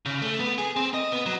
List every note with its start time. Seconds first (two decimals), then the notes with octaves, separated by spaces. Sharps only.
0.06 C#3
0.22 A3
0.40 B3
0.58 G#4
0.76 C4
0.94 D#5
1.12 B3
1.26 F#3